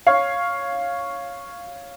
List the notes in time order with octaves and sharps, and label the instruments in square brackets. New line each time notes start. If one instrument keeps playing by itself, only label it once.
[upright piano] C#5 F5